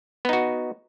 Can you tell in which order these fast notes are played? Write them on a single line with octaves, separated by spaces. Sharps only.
B3 D#4 F#4